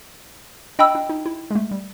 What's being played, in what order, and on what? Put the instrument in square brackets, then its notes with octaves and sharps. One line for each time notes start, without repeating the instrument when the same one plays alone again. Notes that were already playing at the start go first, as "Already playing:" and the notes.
[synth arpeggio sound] D4 [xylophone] D#5 G5 B5 E6
[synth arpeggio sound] D4
D#4
E4
G#3
A3
G3